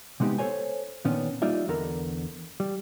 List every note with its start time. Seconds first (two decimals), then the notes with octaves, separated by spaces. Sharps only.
0.20 C3 G#3 B3 D#4 G4
0.38 A4 A#4 C5 C#5 G#5
1.05 A#2 D#3 B3 C#4 D4
1.42 G3 A#3 D#4 F4 D5 E5
1.68 E2 D3 A4 A#4
2.60 G3